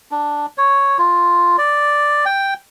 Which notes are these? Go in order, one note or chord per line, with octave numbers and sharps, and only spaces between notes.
D4
C#5
F4
D5
G5